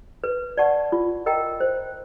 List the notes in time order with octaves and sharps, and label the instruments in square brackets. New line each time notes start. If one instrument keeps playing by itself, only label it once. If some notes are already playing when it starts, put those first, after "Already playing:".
[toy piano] B4
D5 F#5 A5 C#6
F4
A#4 D#5 G5 A#5
C5